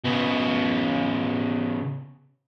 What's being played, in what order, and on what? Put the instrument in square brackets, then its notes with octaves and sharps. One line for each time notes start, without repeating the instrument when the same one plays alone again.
[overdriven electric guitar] C#3 B3